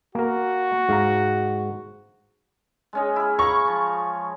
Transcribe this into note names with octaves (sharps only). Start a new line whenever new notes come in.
A#3 F#4 A#4
G#2 F5 A#5
G#3 C#4 D#5
E4 G#4
F5 A#5 B5 C#6
F3